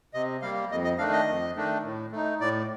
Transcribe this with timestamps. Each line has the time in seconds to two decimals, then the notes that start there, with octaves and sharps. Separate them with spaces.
0.14 C3 D#5
0.42 G3 A#3 F5
0.71 F2 D#5
0.84 D#5
0.98 D#3 A3 D4 F5
1.13 D#5
1.27 F2
1.55 D#3 A3 D4
1.84 A2
2.12 A3 D#4
2.40 A2 D5